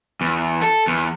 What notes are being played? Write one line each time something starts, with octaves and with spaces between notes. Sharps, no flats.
E2
A4
E2